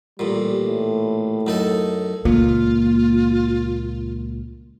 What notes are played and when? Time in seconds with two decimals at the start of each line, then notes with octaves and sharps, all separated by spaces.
0.19 A1 A#2 G3
0.68 A2
1.47 F#2 D#4 A4
2.25 C#2 A#2 A#3 F4